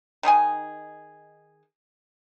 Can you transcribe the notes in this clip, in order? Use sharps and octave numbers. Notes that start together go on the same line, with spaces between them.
D#3 D#4 G#4 G#5